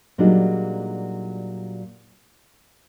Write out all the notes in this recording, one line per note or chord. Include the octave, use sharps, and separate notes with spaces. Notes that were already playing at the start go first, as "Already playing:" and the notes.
A#2 F#3 G3 D4 D#4 G#4